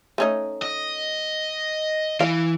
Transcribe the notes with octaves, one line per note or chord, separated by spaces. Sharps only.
A3 C#4 D#4
D#5
E3 F5